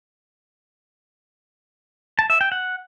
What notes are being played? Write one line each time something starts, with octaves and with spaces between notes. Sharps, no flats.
A5
E5
G5
F#5